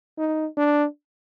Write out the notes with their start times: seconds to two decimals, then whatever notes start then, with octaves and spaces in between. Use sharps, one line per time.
0.18 D#4
0.57 D4